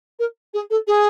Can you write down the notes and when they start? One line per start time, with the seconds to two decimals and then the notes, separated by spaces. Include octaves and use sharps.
0.19 A#4
0.54 G#4
0.70 A4
0.88 G#4